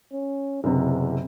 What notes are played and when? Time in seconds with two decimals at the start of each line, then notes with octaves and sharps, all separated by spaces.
0.13 C#4
0.64 F#1 E2 C3